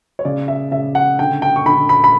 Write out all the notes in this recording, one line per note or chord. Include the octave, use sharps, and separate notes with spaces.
C#5
C#3 D5
E5
C#3 E5
F#5
D3 G5
G5
C#6
D3 B5
B5
B5